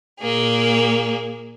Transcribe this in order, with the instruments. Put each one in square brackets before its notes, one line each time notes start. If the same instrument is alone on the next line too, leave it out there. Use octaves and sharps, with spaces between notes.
[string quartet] A#2 A#3 G#4